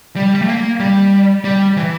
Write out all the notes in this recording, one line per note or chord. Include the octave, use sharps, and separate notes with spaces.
G3
G3
A3
A#3
G3
G3
E3